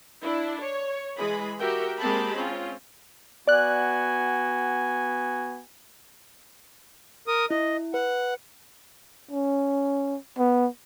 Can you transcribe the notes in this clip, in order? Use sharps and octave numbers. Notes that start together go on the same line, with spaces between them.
D4 E4
C#5
E3 G#3 G#4 B5
F#4 G4 A#4 E5 G5
G#3 A#3 C4 G4 A5 B5
C4 C#4 F4
B3 F#4 D5 G#5 F#6
A#4 D#6
E4 D#5
B4 F#5
C#4
B3